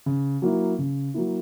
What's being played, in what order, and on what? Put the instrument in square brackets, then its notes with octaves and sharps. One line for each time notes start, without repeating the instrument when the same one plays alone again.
[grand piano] C#3
F#3 A#3 E4
C#3
F#3 A#3 E4